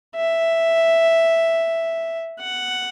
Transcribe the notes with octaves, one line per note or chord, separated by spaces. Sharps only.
E5
F#5